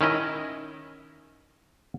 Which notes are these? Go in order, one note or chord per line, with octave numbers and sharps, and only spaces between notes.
D#3 C#4 E4 D#5